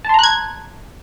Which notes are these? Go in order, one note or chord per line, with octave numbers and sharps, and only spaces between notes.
A5 A#5 C6 F#6 G#6